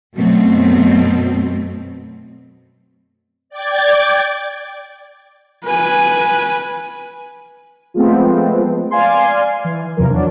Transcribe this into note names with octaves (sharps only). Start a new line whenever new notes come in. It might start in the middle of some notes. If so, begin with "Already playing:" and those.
F#2 B2 F#3 A3 C4
D5 G5 D6 G#6 A6
B4 G#5
F3 G#3 A3 B3 C4
D5 F5 G#5 C6
E3
E2 C3 E3 F3 A#4
F#3 D4